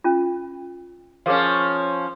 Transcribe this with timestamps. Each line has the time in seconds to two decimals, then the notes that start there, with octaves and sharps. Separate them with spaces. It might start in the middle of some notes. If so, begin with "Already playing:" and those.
0.04 C#4 F4
1.26 F3 C#4 G#4 A#4 F5